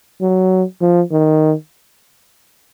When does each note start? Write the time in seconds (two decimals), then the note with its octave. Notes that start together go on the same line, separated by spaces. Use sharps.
0.21 F#3
0.81 F3
1.11 D#3